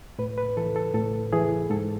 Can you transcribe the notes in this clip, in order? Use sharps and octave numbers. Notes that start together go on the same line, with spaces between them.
A2 B4
B4
E3 A4
A4
A2 A4
E3 G#4
G#2 A4